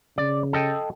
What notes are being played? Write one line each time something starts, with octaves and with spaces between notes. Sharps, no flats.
C#3 D5
A4 D#5 G5